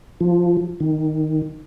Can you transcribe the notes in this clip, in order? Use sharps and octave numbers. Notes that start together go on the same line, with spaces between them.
F3
D#3